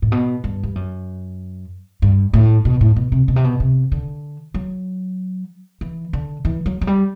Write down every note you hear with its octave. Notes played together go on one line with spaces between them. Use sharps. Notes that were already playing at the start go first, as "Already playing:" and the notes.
A2
B2
G2
G2
F#2
G2
A2
B2
A2
B2
C3
B2
C3
B2
C3
D3
F#3
E3
D3
E3
F#3
F#3
G3